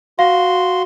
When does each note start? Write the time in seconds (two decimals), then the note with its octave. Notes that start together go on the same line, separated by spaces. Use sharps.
0.19 F#4 F5 C6